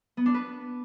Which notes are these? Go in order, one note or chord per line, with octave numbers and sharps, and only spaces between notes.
B3
D4
B4